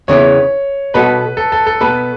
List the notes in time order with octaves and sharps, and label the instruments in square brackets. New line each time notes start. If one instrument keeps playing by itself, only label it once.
[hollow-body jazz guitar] E2 C#3 E3 B3 [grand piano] C#5
[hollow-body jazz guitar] B2 B3 F#4 A4 [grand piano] B4
[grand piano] A4
A4
A4
[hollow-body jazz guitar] B2 B3 A4 [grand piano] B4